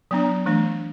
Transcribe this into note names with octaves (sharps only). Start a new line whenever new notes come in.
F#3 B3 D4
E3 A3 D4